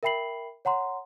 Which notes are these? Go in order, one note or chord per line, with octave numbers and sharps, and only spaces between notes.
A#4 E5 G5 B5 C7 F#7
C#5 F#5 A#5 C6